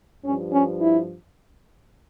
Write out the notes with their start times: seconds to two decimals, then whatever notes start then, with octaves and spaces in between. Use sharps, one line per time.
0.24 G2 C#4
0.28 F3
0.52 C#4
0.80 E4